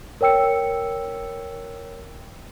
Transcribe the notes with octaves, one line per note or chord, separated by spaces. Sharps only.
A#4 C#5 G5 E6 C#7